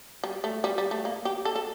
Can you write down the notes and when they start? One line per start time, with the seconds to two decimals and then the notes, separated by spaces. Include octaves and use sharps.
0.24 G3
0.44 A3
0.64 G3
0.78 G3
0.91 A3
1.05 A#3
1.25 G4
1.45 A4
1.56 A4